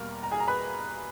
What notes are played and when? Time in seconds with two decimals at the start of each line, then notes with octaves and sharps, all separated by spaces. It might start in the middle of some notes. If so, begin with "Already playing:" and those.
Already playing: E2 B2 G3 A#3 A#4
0.23 A#5
0.31 G#4 G#5
0.40 A#5
0.48 B4 B5